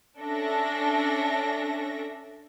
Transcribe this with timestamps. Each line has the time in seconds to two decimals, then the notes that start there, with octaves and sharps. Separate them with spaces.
0.21 C#4 D4 A4 E5 A#6